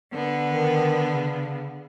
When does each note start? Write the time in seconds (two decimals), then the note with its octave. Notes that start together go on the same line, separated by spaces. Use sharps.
0.12 D3 B3
0.50 D#3
1.10 C#3